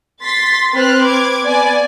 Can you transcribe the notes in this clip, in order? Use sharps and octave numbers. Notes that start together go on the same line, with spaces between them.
C6 A6 B6
C4 B4 C5 F6 F#6
D6 G#6
B3 D5 G#5